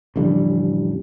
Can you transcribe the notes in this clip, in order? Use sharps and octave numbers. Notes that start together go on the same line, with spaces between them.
A1 F2 D3 G3